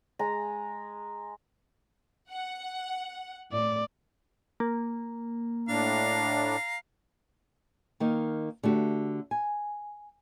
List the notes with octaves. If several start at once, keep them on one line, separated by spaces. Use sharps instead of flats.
G#3 A#5
F#5
A2 D5
A#3
A2 D4 F5 A#5
D#3 A#3 D#4
D3 A3 F#4 G4
G#5